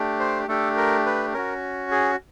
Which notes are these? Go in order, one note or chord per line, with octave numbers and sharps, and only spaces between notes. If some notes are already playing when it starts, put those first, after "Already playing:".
Already playing: A3 D4 G4
C5
A3 D4 G4 A4
A#4
B4
C#4 F#4 A#4
G#4